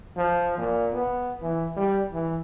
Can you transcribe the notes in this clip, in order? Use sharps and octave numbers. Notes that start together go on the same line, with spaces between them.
F3
A#2
B3
E3
G3
E3